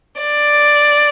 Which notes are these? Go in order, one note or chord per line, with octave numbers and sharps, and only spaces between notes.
D5